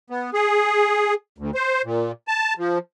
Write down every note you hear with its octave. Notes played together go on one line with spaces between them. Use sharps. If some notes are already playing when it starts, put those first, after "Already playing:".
B3
G#4
D2
C5
A#2
A5
F3